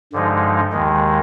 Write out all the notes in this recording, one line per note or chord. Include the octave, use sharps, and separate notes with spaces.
G2 D3 F3 G#3 D#4
D#2 D#3 G#3